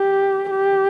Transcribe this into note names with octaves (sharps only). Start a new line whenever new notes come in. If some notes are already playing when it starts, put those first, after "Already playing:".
Already playing: G4
G4